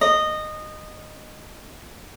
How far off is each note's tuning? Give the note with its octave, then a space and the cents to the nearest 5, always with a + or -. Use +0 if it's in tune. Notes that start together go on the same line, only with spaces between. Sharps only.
D#5 -15